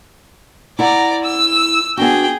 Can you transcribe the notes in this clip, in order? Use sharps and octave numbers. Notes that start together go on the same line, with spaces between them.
E4 D5 F#5 A#5
E6
B3 D4 F#4 G#4 G5